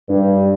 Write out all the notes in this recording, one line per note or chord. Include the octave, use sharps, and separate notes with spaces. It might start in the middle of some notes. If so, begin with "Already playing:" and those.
G2